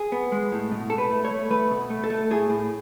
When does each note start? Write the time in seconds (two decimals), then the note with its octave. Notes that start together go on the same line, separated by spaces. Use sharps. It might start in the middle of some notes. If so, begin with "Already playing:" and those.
Already playing: G#4
0.12 B3
0.32 G#3
0.52 A2
0.72 B2
0.90 B2 A4
0.98 B4
1.10 A3
1.25 C#5
1.31 A3
1.51 A3 B4
1.71 B2
1.90 A3
2.04 A4
2.10 A3
2.31 A2 G#4
2.50 A2